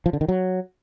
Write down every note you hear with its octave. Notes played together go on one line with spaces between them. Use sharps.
F3
D3
D#3
F#3